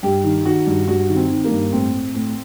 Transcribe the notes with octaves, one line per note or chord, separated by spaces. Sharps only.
G2 G4
D#3
D#3 F#4
G2
G2 F#4
D#3
C4
D#3
A#3
G2
A2 C4
A2
A2